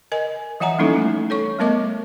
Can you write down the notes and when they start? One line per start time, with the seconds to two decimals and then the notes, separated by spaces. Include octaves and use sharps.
0.12 A#4 D#5 G#5
0.60 E3 F3 E5 F#5 G#5 A#5
0.79 G3 A#3 C#4 D#4 E4 A4
0.96 A3
1.30 A4 C#5 C#6
1.59 G3 A3 B3 A#4 D#5 D6